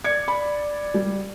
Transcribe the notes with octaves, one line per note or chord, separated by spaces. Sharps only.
D5 G#6 C#7
B5
G3